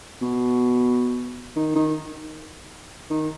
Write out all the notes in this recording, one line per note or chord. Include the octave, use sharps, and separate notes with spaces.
B2
D#3
D#3
D#3